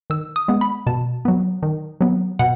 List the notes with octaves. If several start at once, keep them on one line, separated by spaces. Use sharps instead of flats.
D#3 E6
D#6
G#3 B3
B5
B2 A5
F#3 B3
D#3
F#3 B3
B2 F#5